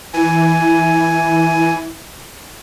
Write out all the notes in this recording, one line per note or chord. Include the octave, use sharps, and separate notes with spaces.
E3 G#5